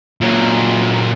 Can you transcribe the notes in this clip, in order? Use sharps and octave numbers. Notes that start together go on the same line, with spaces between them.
A#2 F#3